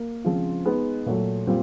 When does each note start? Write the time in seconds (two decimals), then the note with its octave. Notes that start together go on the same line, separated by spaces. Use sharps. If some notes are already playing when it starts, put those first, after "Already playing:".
Already playing: A#3
0.24 C#3 F3 G#3 C4 F4
0.65 G#3 B3 D#4
1.06 A#2 F#3 A3
1.47 A#2 G3 C4 F4